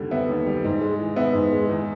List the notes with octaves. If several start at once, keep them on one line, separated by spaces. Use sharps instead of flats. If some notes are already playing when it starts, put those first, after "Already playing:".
Already playing: D#2 D3 G3
B3 E5
D#2
G3
G#2
G#3
E3
B3 E5
G#2
G#3
E2